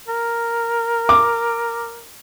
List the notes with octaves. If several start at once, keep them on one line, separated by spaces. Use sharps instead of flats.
A#4
D6